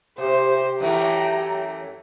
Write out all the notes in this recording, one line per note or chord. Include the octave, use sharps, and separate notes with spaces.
C3 G4 C5
F#2 E3 A3 G5 A#5